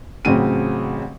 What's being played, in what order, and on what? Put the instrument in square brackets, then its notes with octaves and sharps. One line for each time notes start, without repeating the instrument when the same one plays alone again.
[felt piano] A1 C#3 F#3 C4 D#7